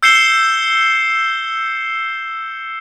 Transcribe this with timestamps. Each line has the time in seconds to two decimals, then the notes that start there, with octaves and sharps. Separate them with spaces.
0.03 E6 G6 C7 C#7 E7 G7